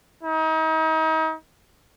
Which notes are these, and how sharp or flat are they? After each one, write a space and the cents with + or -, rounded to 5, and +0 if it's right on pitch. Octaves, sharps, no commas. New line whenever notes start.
D#4 +35